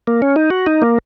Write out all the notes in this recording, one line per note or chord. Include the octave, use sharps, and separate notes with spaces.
A#3
C#4
D#4
F#4
D#4
A#3